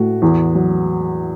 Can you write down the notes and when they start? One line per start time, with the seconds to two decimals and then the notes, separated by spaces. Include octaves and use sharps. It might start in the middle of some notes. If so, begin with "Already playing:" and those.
Already playing: A2 F#4
0.22 E2
0.55 F#3